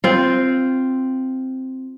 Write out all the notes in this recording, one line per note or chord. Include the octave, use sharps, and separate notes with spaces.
C4 F4